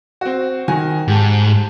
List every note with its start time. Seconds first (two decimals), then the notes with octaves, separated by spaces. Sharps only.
0.21 C4 F#4
0.68 D#3 F#4 G#5
1.08 G#2 G4 A5